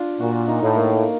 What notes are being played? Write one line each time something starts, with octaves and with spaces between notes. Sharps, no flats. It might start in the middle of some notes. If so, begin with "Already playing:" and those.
Already playing: D4 F4
A#2 F#4
D#4
A2
A#3